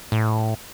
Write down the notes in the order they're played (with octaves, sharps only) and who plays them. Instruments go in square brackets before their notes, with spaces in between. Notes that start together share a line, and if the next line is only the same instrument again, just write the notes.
[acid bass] A2